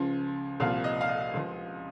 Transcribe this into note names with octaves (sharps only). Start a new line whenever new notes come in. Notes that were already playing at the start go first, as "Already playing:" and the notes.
Already playing: C#2 C#3 F3
C2 A#2 F3 F5
D#5
F5
D#5
C#2 C#3 F3